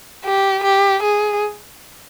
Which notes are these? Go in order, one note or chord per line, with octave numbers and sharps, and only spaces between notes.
G4
G4
G#4